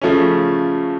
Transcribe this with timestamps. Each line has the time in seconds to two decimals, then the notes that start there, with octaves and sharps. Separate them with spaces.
0.02 C#3 F3 A3 C#4